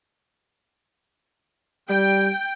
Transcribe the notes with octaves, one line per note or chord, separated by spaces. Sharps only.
G3 G5